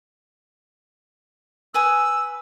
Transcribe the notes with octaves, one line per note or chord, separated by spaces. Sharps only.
B4 G#5 D#6 E6